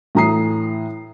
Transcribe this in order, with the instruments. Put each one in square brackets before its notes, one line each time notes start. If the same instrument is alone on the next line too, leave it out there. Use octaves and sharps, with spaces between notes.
[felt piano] A2 E3 A#5 D#6 C7